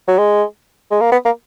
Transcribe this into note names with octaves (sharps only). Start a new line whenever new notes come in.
F#3
G#3
G#3
A#3
B3
A#3